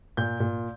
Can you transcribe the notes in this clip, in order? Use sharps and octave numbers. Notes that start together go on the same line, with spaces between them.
A#2 G6
A#2